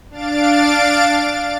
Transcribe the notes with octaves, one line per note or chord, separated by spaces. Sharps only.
D4 F5 A6 D7